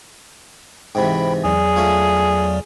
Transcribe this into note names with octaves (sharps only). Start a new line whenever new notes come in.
G#2 C3 E3 G5 B5
E2 F#3 G#4 D5
A3 C#4 F4